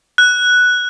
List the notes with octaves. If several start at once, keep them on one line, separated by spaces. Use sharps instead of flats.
F#6